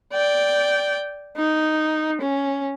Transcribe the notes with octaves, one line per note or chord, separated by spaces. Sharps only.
D5 G5
D#4
C#4